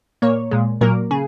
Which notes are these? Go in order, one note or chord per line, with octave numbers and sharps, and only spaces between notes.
A#2 A#3 C#5
A#2 G#3
A#2 F#3 A#3 A#4
C#3 G#4